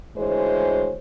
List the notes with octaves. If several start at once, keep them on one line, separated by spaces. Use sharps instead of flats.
D2 E3 G#3 C5 C#5